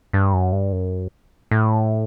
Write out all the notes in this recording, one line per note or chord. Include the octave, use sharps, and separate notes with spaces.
G2
F#2
G2
F#2
A2